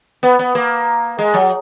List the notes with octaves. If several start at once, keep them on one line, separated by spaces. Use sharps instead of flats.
B3
B3
A#3
G#3
F#3